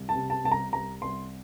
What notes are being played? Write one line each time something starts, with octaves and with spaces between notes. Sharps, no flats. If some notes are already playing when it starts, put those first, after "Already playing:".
Already playing: C2
A5
C3
A5
C2 A5
A#5
C2 A#5
C2 C6